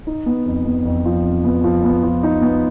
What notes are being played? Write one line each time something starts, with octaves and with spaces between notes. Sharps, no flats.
D#4
B3
F2
B3
F2
F3
F2
B3
F3
B3
F3
D#4
B3